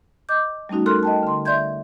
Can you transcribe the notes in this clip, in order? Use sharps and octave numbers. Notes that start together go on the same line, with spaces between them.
D#5 D6 G6
G3 A3 C#4 D#4 F#4
A4 A#4 C6 F6 F#6
D#5 G5 A5
D3 C6
D5 E5 C6 G6 G#6